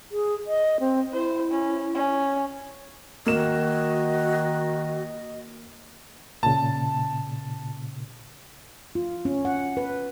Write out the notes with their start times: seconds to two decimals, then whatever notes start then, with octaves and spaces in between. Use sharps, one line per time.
0.11 G#4
0.47 D#5
0.80 C4
1.13 E4 C5
1.51 C#4
1.95 C#4
3.26 D#3 A#3 F#4 D#5 E7
6.43 A#2 C#3 A5
8.95 F4
9.25 C#4
9.45 F#5
9.77 B4